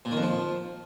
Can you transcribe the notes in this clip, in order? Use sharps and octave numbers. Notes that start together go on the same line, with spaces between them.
A#2
D#3
F2
F3